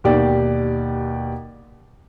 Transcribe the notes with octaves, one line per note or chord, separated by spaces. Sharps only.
D#2 B2 G4 D5